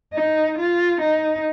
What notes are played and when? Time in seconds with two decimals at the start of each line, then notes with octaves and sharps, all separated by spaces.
0.14 D#4
0.58 F4
1.01 D#4